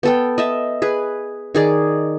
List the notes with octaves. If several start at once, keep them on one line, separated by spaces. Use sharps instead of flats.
B3 A4 G5
D#5 E5 A5
G#4 B4
D#3 G#4 D5